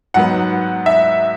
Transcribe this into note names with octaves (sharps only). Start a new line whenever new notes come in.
G#2 F#3 B3 F#5
E5